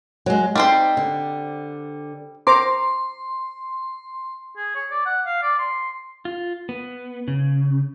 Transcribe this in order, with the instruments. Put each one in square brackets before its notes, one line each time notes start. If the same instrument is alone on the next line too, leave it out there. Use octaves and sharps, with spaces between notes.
[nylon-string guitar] F#3 G#3
[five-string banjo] G3 C4 C5 [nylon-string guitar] D#4
[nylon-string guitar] D3
[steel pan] C5 A#5 D6 [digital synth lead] C6
[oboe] G#4
C#5
D5
F#5
F5
D5
C6
[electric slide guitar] F4
B3
C#3